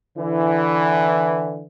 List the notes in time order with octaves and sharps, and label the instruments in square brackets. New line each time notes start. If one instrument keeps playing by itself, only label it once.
[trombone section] D3 E3